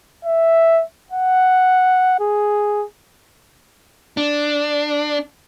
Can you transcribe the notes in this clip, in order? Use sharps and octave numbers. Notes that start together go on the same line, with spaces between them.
E5
F#5
G#4
D4